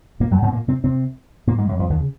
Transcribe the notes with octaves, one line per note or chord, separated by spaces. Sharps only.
A#2 A#3
F#2 F#3
G#2 G#3
C4
A#2 A#3
C3 C4
C3 C4
A#2 A#3
G#2 G#3
F#2 F#3
F2 F3
D#2 D#3
C#3